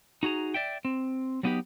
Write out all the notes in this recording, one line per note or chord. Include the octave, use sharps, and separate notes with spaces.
D#4 F#4 G#4 A#5
D5 E5 G5
C4
F#3 G3 B3 D#4 G4 B4